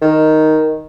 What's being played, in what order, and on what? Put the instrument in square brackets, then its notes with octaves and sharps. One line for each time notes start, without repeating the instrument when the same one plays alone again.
[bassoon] D#3